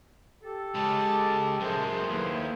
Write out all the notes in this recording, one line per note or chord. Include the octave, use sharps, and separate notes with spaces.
G4 A4
C#3 G#3 A5 D6
F#2 G#3 A3 G#4 A#4 C5 A5
D#2 E4 B4